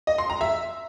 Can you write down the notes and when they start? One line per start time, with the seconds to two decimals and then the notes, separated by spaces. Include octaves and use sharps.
0.07 D#5
0.18 C6
0.30 A#5
0.41 E5